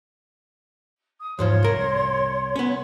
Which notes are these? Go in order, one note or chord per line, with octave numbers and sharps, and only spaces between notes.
D#6
E2 G#2 F3 C#5 C6
C2 A#4
B3 C#4